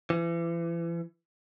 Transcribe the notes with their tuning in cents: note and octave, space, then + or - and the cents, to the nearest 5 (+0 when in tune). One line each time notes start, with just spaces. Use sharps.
E3 +35